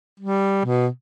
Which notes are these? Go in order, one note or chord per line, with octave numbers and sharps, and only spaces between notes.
G3
B2